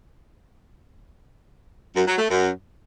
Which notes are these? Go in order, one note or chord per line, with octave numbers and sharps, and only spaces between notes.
F#2
F#3
A3
F#2